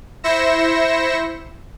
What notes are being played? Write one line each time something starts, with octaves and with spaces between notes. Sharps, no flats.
E4 C5 E5 A#6 C#7 E7